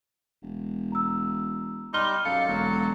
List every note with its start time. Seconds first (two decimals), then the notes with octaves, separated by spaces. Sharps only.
0.42 E1
0.92 A#5 E6
1.94 G3 D#4 C6 F6 G7
2.25 F#2 A4 F5 C#7
2.48 E1 F#3